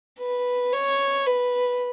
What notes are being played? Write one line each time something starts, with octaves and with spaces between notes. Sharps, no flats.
B4
C#5
B4